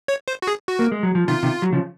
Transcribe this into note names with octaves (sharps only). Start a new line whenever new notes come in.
C#5
C5
F#4
G#4
F#4
A#3
G#3
F#3
F3
C3 D#3 F4
C3 D#3
F#3
C#3 F3